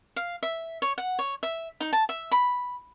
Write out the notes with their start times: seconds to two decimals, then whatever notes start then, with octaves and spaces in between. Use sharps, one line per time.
0.16 F5
0.43 E5
0.82 C#5
0.98 F#5
1.19 C#5
1.43 E5
1.80 D#4
1.93 A5
2.09 E5
2.32 B5